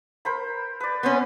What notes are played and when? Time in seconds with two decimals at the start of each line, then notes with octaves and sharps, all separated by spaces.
0.25 A#4 C5 B5
0.80 B4 D5
1.03 B3 C#4 B4 C5